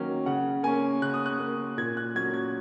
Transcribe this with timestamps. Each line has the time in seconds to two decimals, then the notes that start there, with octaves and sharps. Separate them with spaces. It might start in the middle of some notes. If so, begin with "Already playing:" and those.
Already playing: D#3 F#3 A#3 C#4
0.26 C#3 F#5
0.63 A#3 C#4 G#5
1.02 C#3 F#6
1.14 D#6
1.26 F#6
1.39 A#3 C#4
1.78 A#2 G#6
1.97 F#6
2.15 F#3 A#3 C#4 G#6
2.34 G#6